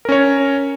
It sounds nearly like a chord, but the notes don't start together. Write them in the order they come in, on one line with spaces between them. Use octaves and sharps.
A#4 C#4 C#5